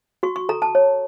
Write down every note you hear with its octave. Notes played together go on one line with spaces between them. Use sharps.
F#4 C#6
C#6
A4 A#5
A5
C#5